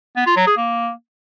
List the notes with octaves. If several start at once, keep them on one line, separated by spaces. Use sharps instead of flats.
B3
F4
F#3
G#4
A#3